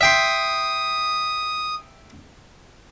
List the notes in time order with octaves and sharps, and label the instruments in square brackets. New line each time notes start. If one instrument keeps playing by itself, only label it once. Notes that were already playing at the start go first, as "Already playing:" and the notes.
[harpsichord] E5 G5 C6 [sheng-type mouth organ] D#6